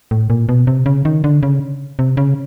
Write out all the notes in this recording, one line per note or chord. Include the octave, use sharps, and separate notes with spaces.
A2
A#2
B2
C3
C#3
D#3
D3
C#3
C3
C#3